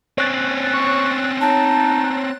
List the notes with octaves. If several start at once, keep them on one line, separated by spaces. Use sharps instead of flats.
C4 C#4 C#5 F#6 A6
C#6
D#4 A5